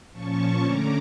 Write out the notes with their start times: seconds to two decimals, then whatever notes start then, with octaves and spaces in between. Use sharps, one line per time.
0.12 A#2 F3 C#4 A5 C#6
0.62 D3 A3 C#4 A#5 D6